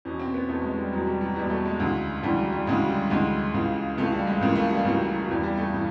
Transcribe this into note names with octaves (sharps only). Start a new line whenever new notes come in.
E2 B2 C#4
C4
B3
E2 B2 A3
G#3
G3
E2 B2 F#3
G3
F#3
E2 B2 G3
A3
G#3
D2 C#3 E3
D2 C#3 E3 G3
F#3
G3
D2 C#3 E3 G#3
G3
D2 C#3 E3 G#3
C#2 C#3 E3
C#2 C#3 E3 A3
G3
G#3
C#2 C#3 E3 A#3
A3
G3
C#2 C#3 E3 F#3
F#3
E2 C#3 E3 G3
G3
A3
C#3 E3